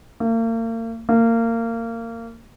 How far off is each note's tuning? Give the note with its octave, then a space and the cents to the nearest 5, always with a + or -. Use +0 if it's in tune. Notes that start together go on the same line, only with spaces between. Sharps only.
A#3 -40
A#3 -25